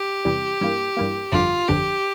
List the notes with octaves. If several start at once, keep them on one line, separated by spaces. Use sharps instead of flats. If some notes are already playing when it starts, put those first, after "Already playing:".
Already playing: G4
E2 C3 E3 G3
G2 E3 A#3
G2 E3 A#3
G1 F2 D3 G3 F4
G1 F2 D3 G3 G4